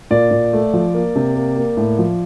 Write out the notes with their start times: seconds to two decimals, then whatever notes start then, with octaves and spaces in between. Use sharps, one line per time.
0.11 A#2 D5
0.31 A#2
0.53 A3
0.74 F3
0.94 A#3
1.16 C3
1.36 A#3
1.56 A#3
1.77 A2
1.98 F3